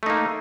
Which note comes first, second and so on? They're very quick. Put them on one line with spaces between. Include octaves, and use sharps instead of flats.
A3 D#4 A#3